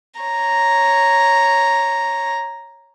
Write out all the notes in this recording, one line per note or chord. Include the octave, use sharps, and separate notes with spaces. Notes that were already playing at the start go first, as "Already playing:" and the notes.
C#5 A#5